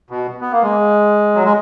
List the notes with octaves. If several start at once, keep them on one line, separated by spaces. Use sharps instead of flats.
B2
B3
A#3
G#3
F#3
G#3